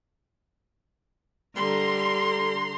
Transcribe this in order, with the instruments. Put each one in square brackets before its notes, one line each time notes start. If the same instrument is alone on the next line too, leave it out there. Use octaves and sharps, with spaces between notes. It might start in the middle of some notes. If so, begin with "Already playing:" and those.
[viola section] D3 A#5 C6 [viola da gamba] G3